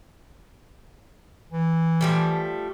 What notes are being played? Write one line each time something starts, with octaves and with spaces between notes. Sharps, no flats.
E3
F3 G3 A3